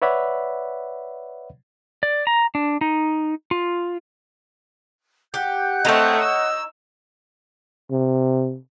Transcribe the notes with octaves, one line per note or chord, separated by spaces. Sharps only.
B4 C#5 D5 E5 F#5 B5
D5
A#5
D4
D#4
F4
G4 F#5 F#6 G6
A3 C4 D#4 C#5 D#5
E6
C3